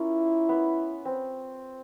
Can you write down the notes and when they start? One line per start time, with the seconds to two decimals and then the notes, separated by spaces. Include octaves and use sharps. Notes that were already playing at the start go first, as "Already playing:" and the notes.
Already playing: A#3 C#4 E4 F4
0.49 B3
1.05 C4